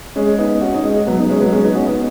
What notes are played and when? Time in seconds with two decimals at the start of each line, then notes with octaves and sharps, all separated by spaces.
0.16 G#3 C#4
0.38 B3 D#4
0.61 C#4 F#4
0.74 D#4
0.84 G#3 C#4
1.07 F#3 B3
1.18 B3 D#4
1.29 G#3 C#4
1.40 F#3 B3
1.52 G#3 C#4
1.64 B3 D#4
1.75 C#4 F#4
1.87 B3 D#4